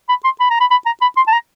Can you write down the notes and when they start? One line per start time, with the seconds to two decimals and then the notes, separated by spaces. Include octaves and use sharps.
0.09 B5
0.24 C6
0.40 B5
0.50 A#5
0.60 B5
0.71 B5
0.86 A#5
1.01 B5
1.17 C6
1.27 A5
1.32 A#5